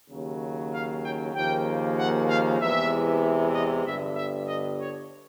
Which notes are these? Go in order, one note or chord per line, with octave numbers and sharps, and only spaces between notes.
D#2 C#3 F#3
F5
G5
D#2 C#3 F3 A#3 G5
F#5
F5
E2 C3 E3 G#3 E5
D#5
G1 G2 D3 E5
E5
D#5
C#5